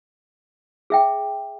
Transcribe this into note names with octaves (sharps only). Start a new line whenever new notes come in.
G#4 E5 G5